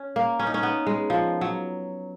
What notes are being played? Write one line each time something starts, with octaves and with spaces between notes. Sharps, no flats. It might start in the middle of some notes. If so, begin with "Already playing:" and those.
Already playing: C#4
A#3
C#4
D#4
C#4
B3
G#3
F3
F#3